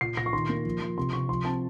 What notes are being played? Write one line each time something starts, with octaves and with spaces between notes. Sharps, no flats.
A#2 C7
A#2 A#6
C#6
D#3 C6
A#3
F3
F3
C3 C6
C3 C#6
F3 C6
C4 A5